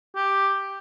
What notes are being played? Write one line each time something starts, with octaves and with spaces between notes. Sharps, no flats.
G4